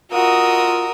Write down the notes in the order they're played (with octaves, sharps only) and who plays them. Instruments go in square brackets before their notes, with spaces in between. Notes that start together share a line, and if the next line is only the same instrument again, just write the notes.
[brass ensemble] F4 [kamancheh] F#4 [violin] A#4 [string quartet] D#5 D#6 E6